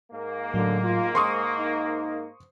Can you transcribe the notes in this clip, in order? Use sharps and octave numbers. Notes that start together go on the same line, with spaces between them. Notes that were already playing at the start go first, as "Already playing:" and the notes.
G#2 A#3
A2 D3 F#3
F4
G#3 C5 C6 C#6 D#6
D#4